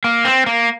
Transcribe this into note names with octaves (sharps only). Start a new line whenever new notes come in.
A#3
C4
A#3